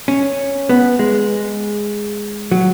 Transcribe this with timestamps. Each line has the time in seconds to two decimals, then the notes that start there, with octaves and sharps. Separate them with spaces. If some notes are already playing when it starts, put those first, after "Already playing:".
0.08 C#4
0.69 B3
0.99 G#3
2.51 F#3